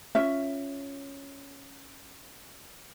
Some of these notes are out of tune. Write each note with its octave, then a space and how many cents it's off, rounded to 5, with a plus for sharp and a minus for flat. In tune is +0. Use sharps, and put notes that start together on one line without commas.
C#4 +0 F4 +0 E5 +10